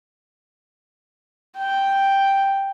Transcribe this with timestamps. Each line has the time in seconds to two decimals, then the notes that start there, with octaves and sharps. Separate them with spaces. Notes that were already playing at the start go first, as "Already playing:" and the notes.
1.58 G5